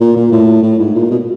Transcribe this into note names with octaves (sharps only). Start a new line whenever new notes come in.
A#2
A#2
A2
A2
G#2
A#2
B2